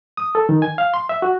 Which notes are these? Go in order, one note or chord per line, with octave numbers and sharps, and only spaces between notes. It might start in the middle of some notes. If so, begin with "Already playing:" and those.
D#6
A4
D#3
G#5
F5
C6
E5
F#4